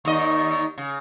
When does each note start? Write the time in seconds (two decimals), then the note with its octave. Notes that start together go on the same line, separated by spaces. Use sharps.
0.05 D#2 D#4 D5 D#5 C#6
0.78 C#3